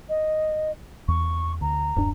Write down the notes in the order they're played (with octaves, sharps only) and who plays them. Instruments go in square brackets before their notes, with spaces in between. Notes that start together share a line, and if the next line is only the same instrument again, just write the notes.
[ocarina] D#5
[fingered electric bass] E2 [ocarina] C#6
[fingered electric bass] D2 [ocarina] A#5
[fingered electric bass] D1 F#2 D4